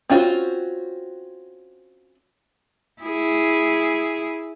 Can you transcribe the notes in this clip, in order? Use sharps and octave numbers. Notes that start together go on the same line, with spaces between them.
C4 C#4 F4 F#4 C5
E4 G#4